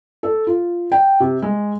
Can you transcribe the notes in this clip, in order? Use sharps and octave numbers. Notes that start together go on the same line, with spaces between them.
A4
F4
G5
C3
G#3